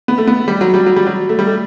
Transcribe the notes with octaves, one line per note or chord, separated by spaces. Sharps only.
B3
A3
B3
G3
F#3
G3
F#3
G3
F#3
A3
G3
A3